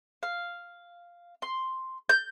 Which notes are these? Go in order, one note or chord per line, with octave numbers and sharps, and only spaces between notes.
F5
C6
G6